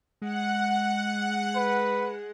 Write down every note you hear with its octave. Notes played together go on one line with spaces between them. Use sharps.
G#3 F#5
B4